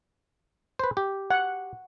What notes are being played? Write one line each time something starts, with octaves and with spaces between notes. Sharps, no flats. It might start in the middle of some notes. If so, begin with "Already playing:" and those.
B4 C5
G4
F#5